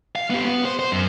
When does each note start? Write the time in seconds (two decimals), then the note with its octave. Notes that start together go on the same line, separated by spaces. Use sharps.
0.16 F5
0.30 B3 G4
0.45 B3
0.65 C5
0.79 C5
0.92 F#2